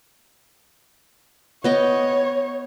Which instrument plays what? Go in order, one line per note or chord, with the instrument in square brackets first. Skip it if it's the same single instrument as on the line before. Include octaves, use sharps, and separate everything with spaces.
[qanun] B3 D#5 G5 [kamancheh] C#5